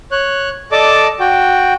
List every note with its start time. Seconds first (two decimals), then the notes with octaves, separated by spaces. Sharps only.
0.12 C#5 F#6
0.72 A4 D5 D#5 A5 D6
1.20 F#4 G5